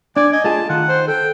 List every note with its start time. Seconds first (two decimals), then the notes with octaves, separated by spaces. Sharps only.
0.17 D4 D5 G#5
0.33 D#5 G#5
0.44 A3 F4 G#4 A5
0.69 D#3 D#4 F4 F#5
0.89 C5
1.08 A4 G5